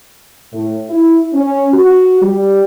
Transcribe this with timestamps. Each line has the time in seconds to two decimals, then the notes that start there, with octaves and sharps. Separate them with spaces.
0.53 A2
0.90 E4
1.33 C#4
1.73 F#4
2.22 G3